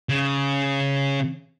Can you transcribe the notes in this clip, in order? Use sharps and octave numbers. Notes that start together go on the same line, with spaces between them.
C#3